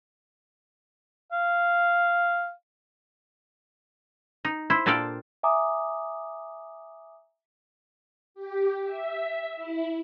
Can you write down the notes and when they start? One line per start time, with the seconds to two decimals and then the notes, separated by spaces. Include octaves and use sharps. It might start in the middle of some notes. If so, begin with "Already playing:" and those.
1.32 F5
4.45 D#4
4.70 E4 C5
4.86 A#2 D4 A4 D5 F5 G5
5.43 E5 G#5 A#5 D6 D#6
8.34 G4
8.85 E5
9.56 E4